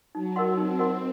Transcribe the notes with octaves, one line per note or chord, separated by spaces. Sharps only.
F#3 D#4
A#4 D#5 F#5 C6
C4 D#4
A#4 D#5 F#5 C6